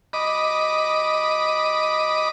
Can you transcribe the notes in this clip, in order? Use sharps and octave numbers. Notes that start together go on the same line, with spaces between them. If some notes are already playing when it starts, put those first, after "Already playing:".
D#5 B5 D6